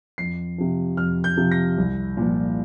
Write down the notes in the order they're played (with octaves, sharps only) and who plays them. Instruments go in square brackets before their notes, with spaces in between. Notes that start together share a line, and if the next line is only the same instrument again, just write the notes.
[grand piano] F2 C7
C3 F3
F2 F6
G6
C3 F3
A#6
C2
A#2 F3